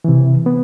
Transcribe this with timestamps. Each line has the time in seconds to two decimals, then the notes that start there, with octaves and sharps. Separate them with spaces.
0.04 C3 E3
0.46 B3